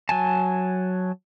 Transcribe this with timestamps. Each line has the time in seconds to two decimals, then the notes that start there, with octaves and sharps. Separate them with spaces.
0.09 F#3 G#5 A5